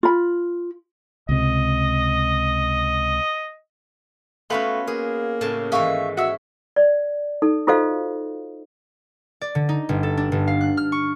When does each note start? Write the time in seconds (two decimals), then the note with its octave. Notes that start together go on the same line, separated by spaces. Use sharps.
0.03 F4 B5
1.29 C#2 C3 D#5
4.50 A3 B3 C#4 F#4 B4 F5 C6
4.87 A#3 G#4
5.41 A2 C#3 A5
5.72 G#2 D#3 E3 E5 F5 C#6
6.17 C#4 F#4 E5 E6
6.76 D5
7.42 D#4 A4
7.67 F4 F#4 A4 C5 D#5 F5
9.41 D5
9.55 D3
9.69 D#4
9.89 G1
10.03 A4
10.17 D4
10.32 G1
10.47 F5
10.61 F#6
10.77 F6
10.92 C#6